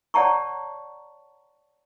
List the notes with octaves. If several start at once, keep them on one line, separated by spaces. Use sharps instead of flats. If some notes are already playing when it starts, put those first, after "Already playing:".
C#5 D5 F#5 A5 A#5 C#6